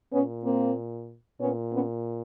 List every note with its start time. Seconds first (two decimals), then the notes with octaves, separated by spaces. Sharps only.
0.13 A#2 B3 C#4
0.45 A#3 C4
1.41 A#2 B3 C#4
1.73 B3 C#4